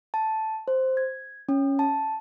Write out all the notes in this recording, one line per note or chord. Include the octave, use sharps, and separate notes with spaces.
A5
C5
G#6
C#4
A5